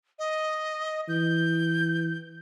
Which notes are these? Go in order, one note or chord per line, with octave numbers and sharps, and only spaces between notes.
D#5
E3 G6